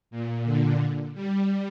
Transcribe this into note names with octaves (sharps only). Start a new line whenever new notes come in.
A#2
D3
G3